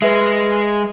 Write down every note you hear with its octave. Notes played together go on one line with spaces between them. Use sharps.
G#3 B4 E5